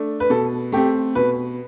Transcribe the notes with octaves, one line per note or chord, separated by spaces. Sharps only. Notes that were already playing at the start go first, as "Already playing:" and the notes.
Already playing: A3 D4
B4
B2 A4
A3 C4 G4
B2 B4